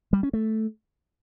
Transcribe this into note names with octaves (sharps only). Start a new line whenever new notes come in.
G3
C#4
A3